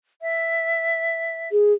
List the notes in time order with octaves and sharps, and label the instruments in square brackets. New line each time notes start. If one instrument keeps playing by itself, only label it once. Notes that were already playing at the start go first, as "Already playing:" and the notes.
[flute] E5
[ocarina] G#4